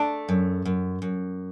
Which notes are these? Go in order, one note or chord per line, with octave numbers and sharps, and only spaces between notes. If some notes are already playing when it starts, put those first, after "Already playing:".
Already playing: A3 D4
F#2
F#2
F#2